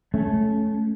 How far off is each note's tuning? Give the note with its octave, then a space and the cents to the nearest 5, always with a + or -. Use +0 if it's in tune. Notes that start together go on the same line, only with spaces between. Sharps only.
A3 -20 C#4 +0